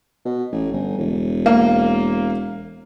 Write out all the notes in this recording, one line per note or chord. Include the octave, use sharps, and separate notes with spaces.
B2
A1
G1
E1
A#3